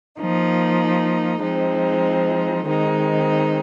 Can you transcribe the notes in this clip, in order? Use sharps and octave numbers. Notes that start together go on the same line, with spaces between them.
F3 A#3 D#4
F3 G#3 C4 D#4
D#3 G#3 C4 D#4